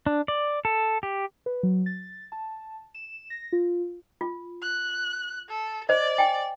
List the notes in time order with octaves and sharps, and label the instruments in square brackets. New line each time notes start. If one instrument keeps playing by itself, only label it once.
[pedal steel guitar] D4
D5
A4
G4
[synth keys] B4
F#3
A6
A5
E7
A#6
F4
[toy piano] F4
[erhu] F#6
A4
[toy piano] C5 D#5 [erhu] D5
[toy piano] G5 G#5